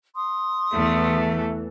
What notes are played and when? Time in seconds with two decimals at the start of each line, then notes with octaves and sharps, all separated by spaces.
0.15 C6 D#6
0.73 E2 E3 A3